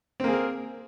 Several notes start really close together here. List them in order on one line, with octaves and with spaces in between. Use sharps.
C4 A#3 G#4 A#4